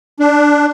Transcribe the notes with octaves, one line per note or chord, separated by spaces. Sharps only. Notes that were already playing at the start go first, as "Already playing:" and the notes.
D4